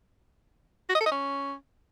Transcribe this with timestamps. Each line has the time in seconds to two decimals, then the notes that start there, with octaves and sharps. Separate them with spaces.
0.89 F#4
0.95 D#5
1.00 A4
1.06 D#5
1.12 C#4